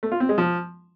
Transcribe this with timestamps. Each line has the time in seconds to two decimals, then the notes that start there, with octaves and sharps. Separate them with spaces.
0.03 A3
0.12 F4
0.20 C4
0.29 G#3
0.38 F3